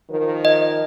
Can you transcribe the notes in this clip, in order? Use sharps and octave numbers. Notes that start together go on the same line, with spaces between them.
D#3 F3 A#4
D#5